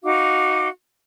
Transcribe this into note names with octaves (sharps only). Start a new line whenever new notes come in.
D#4 F#4 F5 D6